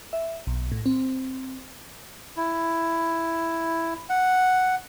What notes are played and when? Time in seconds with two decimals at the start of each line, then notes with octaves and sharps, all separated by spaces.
0.13 E5
0.47 B1
0.72 A2
0.86 C4
2.36 E4
4.10 F#5